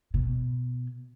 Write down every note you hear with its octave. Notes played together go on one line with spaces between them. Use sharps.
B2